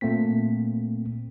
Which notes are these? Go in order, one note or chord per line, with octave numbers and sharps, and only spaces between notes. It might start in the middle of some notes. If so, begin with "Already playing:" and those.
A#2 A3 A#3 C4 B6